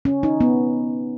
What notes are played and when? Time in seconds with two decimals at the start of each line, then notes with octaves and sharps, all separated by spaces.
0.05 C#4
0.23 D#4
0.41 B3